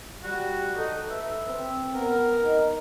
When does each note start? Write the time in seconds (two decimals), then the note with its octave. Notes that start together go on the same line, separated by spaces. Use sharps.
0.24 G3 F#4
0.77 D#4 A4
1.10 B4 E5
1.48 C4
1.95 B3 A#4
2.43 D#4